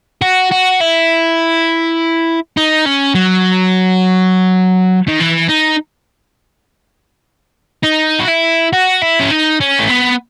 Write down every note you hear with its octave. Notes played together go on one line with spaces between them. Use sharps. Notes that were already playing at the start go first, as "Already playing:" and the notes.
F#4
F#4
E4
D#4
C#4
F#3
D#3
E3
D#4
D#4
F#4
E4
F#4
E4
C#4
D#4
C#4
A3
B3